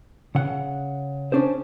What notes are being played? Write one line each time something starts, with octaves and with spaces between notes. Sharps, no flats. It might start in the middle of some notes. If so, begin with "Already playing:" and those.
C#3 F#5
C#4 D4 G#4 C5